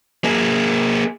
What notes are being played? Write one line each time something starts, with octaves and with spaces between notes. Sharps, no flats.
A#3 G#4